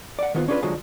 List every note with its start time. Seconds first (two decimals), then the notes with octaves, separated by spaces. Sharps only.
0.19 D5 F#5
0.35 D#3 A#3 B3 F4 C5
0.48 C#4 D4 F4 G#4 B4
0.63 D2 D3 F3 F#3 G#3